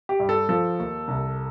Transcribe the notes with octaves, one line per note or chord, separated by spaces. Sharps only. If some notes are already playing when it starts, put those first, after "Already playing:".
G4
G2
A4
F3 A4
D#2
C2